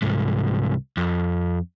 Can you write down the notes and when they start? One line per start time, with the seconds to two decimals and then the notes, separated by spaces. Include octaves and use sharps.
0.02 C2 G#2
0.97 F2